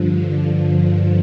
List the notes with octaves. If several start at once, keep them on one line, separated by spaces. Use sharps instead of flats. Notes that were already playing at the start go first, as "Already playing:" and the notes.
Already playing: G2 D3 F3